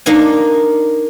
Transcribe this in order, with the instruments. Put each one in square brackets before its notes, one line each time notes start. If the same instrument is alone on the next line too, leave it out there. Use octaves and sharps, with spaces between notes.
[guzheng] A#3 D4 D#4 G#5